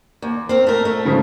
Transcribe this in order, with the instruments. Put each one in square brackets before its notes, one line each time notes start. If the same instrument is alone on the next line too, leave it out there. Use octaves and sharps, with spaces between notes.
[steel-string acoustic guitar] D#2
C4 A#4
A3 A#4
A3
[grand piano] G#2 C#3 F3